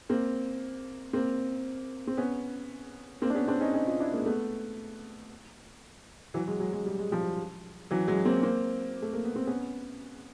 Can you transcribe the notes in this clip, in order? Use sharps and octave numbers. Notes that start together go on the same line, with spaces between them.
A#3 C4
A#3 C4
C4
B3 C#4
A#3 C4
D4
B3 C#4
C4 D4
C#4 D#4
C#4 D#4
D#4 F4
D4 E4
G#3 A#3
A3 B3
E3 F#3
F#3 G#3
F#3 G#3
F#3 G#3
G3
G#3
F3 G3
E3 F#3
F#3 G#3
A#3 C4
A#3 C4
A3
A#3
B3
C4
B3 C#4